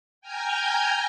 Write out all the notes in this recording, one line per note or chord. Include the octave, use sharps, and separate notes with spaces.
G5 G#5 A#5 F6 G6 G#6